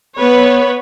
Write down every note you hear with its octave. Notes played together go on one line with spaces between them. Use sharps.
B3 B4 C#5